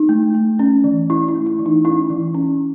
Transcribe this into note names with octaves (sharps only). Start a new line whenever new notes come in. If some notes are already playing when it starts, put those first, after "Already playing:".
Already playing: D#4
A3
A3
C#4
E3
C#4 E4
E4
A3
E4
E3
D#4
C#4 E4
E3
C#4